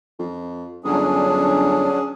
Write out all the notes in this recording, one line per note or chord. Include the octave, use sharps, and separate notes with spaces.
F2
G1 F#3 C#4 D4 G#4